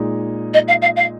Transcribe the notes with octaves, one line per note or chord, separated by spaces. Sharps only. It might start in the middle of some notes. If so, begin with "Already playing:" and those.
Already playing: A#2 G#3 D#4
D#5
F5
F5
F5